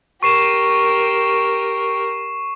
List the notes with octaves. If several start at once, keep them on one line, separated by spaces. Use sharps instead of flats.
G4 A#4 C#6 C7 E7